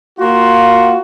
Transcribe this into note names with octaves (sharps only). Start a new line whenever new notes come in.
A#3 F4 F#4